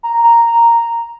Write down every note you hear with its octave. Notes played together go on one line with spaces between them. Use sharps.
A#5
A#5
A#5